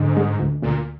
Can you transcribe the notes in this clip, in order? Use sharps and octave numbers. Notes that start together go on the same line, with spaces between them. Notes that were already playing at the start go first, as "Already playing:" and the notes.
Already playing: G#2 D3
G#3
D2
D2 A#2